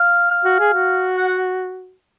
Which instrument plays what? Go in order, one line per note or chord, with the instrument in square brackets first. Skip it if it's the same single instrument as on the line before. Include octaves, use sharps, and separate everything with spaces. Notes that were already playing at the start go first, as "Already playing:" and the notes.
Already playing: [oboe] F5
F5
[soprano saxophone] F#4
G#4
F#4
[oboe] F#5
F#5